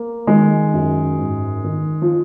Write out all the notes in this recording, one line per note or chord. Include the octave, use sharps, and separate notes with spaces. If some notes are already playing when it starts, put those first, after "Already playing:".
Already playing: A#3
D#3 G#3
F#2
G#2
D#3
F3